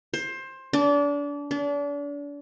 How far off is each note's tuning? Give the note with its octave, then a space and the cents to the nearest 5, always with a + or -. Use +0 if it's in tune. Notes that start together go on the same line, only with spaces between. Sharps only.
C5 +20
D4 -30
D4 -35